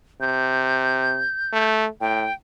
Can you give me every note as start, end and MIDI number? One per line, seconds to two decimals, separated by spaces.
0.21 1.24 48
0.21 1.72 91
1.53 1.87 57
2.01 2.26 45
2.01 2.33 79